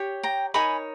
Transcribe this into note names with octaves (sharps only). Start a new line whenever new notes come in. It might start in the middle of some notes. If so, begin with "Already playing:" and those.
Already playing: G4 C#5
G5 A#5
D#4 A#4 C#5 G#5 B5